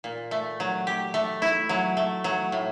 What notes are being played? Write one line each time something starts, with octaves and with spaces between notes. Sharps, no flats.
A#2
A3
F#3
G4
A3
E4
F#3
A3
F#3
A2